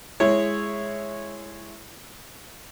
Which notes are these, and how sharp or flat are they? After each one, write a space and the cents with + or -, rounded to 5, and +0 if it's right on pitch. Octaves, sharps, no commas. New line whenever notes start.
G#3 +0 E4 +0 C#5 -10